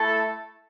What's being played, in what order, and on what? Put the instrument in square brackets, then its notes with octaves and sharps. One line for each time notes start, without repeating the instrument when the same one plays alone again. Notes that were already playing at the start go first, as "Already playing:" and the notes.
Already playing: [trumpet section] A3 E4 A4